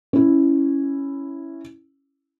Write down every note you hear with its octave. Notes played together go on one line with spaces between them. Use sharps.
C#4 E4